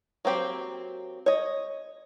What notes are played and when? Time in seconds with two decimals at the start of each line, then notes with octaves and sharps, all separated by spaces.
0.25 F#3 A#3 C4 G4
1.26 C#5 D#5